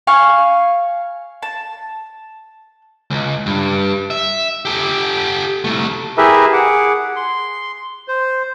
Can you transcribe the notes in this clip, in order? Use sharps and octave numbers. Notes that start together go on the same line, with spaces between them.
F5 G#5 C#6 F6
A5
C#2
G2
E5
G4 A4
C2 A3
E4 G4 G#4 A#4 B4 E5
G#4 F#5 D6
C6
C5